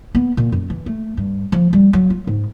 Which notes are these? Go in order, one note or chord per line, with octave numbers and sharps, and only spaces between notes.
B3
A#2
F#2
E3
A3
G2
F3
G3
F#3
F4
G#2